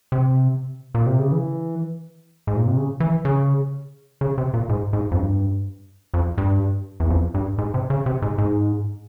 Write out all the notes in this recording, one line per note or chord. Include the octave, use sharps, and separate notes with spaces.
C3
A#2
C3
C#3
E3
G#2
A#2
C3
C#3
E3
C#3
C#3
C3
A#2
G#2
G#2
F2
G2
F2
G2
E2
F2
G2
G#2
C3
C#3
C3
G#2
G#2